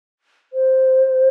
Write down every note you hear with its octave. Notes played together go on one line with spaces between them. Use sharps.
C5